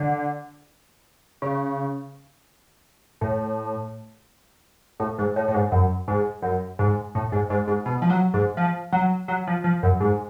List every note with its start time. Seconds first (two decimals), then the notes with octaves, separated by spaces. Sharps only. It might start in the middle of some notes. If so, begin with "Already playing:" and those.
Already playing: D3
1.42 C#3
3.21 A2
5.00 A2
5.18 G#2
5.36 A2
5.48 A2
5.54 G#2
5.72 F#2
6.08 G#2
6.42 F#2
6.79 G#2
7.15 A2
7.32 G#2
7.50 G#2
7.67 G#2
7.86 B2
8.02 F3
8.10 F#3
8.34 G#2
8.57 F3
8.92 F#3
9.28 F#3
9.47 F3
9.64 F3
9.83 F#2
10.00 G#2